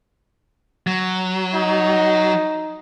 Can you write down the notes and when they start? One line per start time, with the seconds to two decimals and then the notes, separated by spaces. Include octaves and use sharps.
0.87 F#3
1.54 D#4